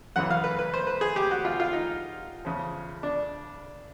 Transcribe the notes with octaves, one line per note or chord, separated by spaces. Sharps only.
F#2 C#3 E3 F#5
F5
B4
B4
C5
B4
G#4
G4
F#4
F4
F4
D#4
E2 C#3 F3
D4